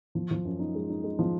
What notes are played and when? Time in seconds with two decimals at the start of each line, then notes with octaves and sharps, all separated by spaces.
0.15 F3
0.31 F3
0.45 F#2
0.59 D#4
0.75 G#3
0.90 D#4
1.04 G#3
1.19 F3